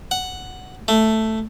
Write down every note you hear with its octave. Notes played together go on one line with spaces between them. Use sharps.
F#5
A3